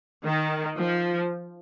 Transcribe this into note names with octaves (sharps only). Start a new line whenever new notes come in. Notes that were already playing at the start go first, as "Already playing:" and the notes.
D#3
F3